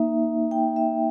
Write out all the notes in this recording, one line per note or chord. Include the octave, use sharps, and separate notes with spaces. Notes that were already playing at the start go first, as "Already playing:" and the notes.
Already playing: A#3 D#4 E5
G5
E5